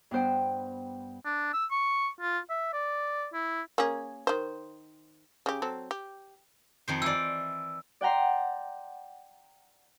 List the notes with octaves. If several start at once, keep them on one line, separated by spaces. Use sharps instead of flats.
G2 B3 C5 G5
D4
E6
C#6
F4
E5
D5
E4
A#3 C#4 G#4
D#3 C5
C#3 G4
F#3 C4 A4
G4
F2 D#3 C5
E3 D5 E6
D5 F#5 G5 A#5 C6